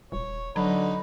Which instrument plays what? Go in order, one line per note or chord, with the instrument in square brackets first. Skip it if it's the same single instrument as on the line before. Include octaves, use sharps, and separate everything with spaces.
[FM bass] D#1 [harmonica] C#5
[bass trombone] D3 [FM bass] F#3 [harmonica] D#4 B4